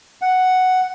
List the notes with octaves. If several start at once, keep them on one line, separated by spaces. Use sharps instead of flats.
F#5